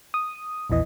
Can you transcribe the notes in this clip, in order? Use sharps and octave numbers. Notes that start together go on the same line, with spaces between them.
D#6
A#1 E2 E3 D#5